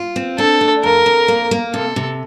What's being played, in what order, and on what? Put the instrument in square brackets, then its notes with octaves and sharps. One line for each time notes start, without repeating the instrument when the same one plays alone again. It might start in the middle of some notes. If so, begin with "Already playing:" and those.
Already playing: [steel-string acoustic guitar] F4
C4
[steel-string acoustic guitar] D4 [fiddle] A4
[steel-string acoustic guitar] A3
[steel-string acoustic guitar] F2 [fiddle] A#4
[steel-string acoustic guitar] F2
A#3
A#3
[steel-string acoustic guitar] C3 [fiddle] A4
[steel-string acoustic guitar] C3